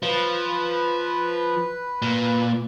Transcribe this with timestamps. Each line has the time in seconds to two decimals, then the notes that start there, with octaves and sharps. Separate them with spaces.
0.03 F3 B4
2.02 A#2